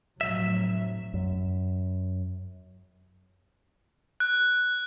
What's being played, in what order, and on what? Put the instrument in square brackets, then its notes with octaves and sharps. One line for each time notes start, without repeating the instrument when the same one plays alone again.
[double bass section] F1 F#3 [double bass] A2 [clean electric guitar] E5
[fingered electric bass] F#2
[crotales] F#6